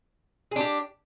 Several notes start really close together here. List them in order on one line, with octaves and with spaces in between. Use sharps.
G#4 D4 G4